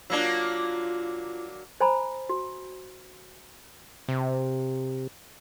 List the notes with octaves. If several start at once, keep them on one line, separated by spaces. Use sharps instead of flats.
F#3 A#3 D4 F4
C5 G#5 A#5 B5
F#4
C3